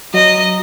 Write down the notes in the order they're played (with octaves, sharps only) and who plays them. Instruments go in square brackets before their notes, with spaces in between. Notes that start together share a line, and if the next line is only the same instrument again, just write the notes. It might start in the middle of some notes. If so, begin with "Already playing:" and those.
[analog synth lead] F#3 [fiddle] D#5